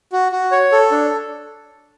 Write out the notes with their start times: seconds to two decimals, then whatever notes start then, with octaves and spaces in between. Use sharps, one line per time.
0.12 F#4
0.32 F#4
0.52 C#5
0.72 A4
0.91 D4